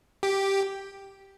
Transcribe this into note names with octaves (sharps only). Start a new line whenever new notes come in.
G4